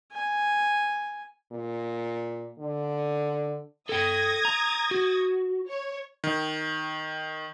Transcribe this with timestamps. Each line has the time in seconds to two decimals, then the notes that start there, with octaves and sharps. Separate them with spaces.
0.12 G#5
1.52 A#2
2.58 D3
3.89 A4 G5 D#6 G#6 A#6
4.45 A#5
4.91 F#4
5.69 C#5
6.24 D#3